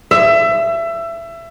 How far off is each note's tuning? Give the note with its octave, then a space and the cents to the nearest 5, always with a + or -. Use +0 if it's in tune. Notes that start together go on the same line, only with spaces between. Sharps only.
E5 +25